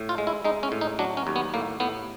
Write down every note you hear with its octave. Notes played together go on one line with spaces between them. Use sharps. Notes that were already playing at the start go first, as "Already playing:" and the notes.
Already playing: A2
F4
G#3
E4
G#3 D#4
C#4
A2
D#4
F#3 D4
C#4
D#2
B3
A2 A#3
A2 B3